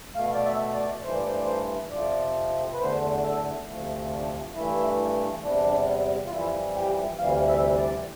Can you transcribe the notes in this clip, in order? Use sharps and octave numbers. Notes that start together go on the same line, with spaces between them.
B2 A3 F5
D5
E5
D5
G2 E3 A3 C5
D5
C5
D5
C5
F2 C3 F3 D5
B4
E2 D3 A3 C5
A4
D2 C3 F3 A3
D4
G2 E3 A3 E4
E2 C3 G3 D4
F4
F2 E3 G3 E4
G4
D2 C3 E3 G3 F5
E5
D5